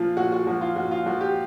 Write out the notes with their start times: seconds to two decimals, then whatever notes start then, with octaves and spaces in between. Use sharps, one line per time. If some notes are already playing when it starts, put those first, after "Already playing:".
Already playing: A#2 F3 F4
0.17 A#2 F#4
0.32 F#4
0.47 F3 F#4
0.61 F4
0.76 A#2 F#4
0.91 F4
1.06 F3 F#4
1.21 G4